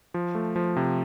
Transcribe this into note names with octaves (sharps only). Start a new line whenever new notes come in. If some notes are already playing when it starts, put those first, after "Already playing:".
F3
A3
F3
C3